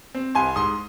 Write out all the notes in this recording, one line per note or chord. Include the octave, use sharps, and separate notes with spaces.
C4
C2 G#5 C6
G#2 C6 D#6